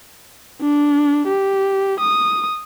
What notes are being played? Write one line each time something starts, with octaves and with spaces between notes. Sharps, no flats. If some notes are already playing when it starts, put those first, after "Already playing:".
D4
G4
D#6